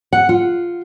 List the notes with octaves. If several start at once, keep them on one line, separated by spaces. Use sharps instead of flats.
F#5
F4